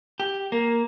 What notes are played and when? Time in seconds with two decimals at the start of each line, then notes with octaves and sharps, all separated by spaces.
0.20 G4
0.52 A#3